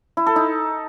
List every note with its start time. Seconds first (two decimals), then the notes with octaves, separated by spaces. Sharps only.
0.17 E4
0.26 A4
0.36 D#4